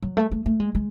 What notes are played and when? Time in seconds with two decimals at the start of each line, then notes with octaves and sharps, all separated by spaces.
0.02 F#3
0.17 A3
0.32 A3
0.46 A3
0.60 G#3
0.75 G#3